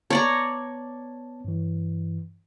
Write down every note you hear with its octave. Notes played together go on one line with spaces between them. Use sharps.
B3 C#5 D5 A5 A#5
G2 E3